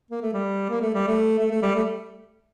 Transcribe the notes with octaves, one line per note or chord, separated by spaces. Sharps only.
A#3
A3
G3
A#3
A3
G3
A3
A3
A3
G3
A3